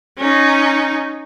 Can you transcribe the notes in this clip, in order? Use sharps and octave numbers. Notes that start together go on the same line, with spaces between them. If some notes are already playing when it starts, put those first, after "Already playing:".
C#4 D#4